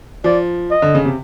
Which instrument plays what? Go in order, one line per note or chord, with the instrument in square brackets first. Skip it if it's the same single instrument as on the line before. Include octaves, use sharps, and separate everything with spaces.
[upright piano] F3 [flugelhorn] D5
[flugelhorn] D#5
[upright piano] D3
C#3
C3